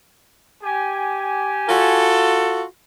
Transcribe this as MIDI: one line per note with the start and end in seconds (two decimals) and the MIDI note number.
0.63 2.25 67
0.63 2.25 80
1.69 2.63 65
1.69 2.63 66
1.69 2.63 69